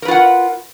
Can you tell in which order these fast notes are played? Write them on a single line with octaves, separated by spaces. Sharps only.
A#4 B4 F4 F#5